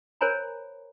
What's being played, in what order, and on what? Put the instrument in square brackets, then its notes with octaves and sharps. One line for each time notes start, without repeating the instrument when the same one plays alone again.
[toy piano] A#4 C5 C#5 G#5 A#5 B5